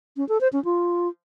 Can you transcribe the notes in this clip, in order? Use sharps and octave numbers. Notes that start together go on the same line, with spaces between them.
C#4
A4
C5
C#4
F4